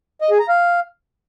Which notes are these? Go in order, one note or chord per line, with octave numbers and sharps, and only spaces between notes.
D#5
G#4
A#5
F5